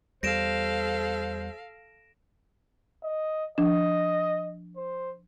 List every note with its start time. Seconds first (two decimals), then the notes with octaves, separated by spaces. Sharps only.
0.23 E2 G3 A4 C5 F5 A#6 D7 E7
3.04 D#5
3.58 F3 D4 D#5
4.77 C5